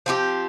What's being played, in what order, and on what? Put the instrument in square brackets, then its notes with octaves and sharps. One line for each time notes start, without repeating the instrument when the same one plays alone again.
[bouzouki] F3 C4 E4 G4